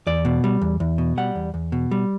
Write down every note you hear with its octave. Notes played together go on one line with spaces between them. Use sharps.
E2 D5
B2
G3
E2
E2
B2
G3 F#5
E2
E2
B2
G3